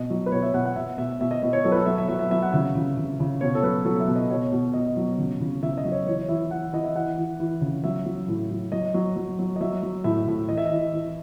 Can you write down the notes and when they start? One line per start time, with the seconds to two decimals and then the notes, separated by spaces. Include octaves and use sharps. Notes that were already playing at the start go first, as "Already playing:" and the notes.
Already playing: B2 D#5
0.10 F#3
0.26 B4
0.32 B2 C#5
0.42 E5
0.53 B2 F#5
0.66 F#5
0.76 B2 E5
0.98 B2 E5
1.20 B2 E5
1.31 D#5
1.43 B2 D#5
1.53 C#5
1.64 F#3 A4
1.72 B4
1.75 A4
1.86 F#3 E5
1.98 E5
2.09 F#3 E5
2.19 E5
2.31 F#3 E5
2.42 F#5
2.52 C#3 E5
2.75 C#3
2.97 C#3
3.20 C#3
3.41 B2 C#5
3.55 A4
3.63 F#3 B4
3.85 F#3 A4
4.00 E5
4.08 B2
4.16 D#5
4.30 B2 C#5
4.52 B2
4.74 B2 D#5
4.97 F#3
5.18 C#3
5.41 C#3
5.62 C#3 E5
5.78 D#5
5.85 F#3
5.92 C#5
6.07 E3 C#5
6.29 E3 E5
6.51 E3 F#5
6.73 E3 D#5
6.84 E5
6.96 E3 F#5
7.18 E3
7.39 E3
7.61 C#3
7.84 F#3 E5
8.06 F#3
8.28 A2
8.50 F#3
8.72 F#3 D#5
8.94 F#3
9.16 F#3
9.39 F#3
9.56 D#5
9.61 F#3 E5
9.83 F#3
10.04 A2 E5
10.28 A2
10.49 E3 D#5
10.57 E5
10.66 D#5
10.71 E3
10.93 E3